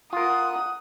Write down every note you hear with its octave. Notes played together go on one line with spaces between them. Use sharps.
F4 A#4 F#5 D#6